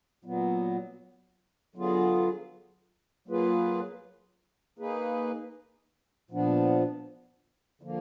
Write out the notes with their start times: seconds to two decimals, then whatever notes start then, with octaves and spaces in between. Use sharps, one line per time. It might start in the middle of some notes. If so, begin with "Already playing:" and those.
0.24 A#2 F#3 B3
1.75 D3 F#3 B3 F4 G#4
3.28 F#3 A#3 F4 G#4 B4
4.79 A#3 D#4 G#4 B4
6.31 A#2 F3 B3 D4
7.82 D3 F3 A#3